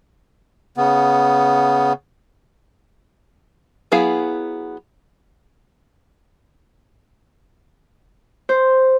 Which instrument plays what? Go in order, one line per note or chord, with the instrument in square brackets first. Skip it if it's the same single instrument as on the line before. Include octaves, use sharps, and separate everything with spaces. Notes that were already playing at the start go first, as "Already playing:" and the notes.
[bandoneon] C#3 B3
[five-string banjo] F#3 B3 E4 G#4 F5
[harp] C5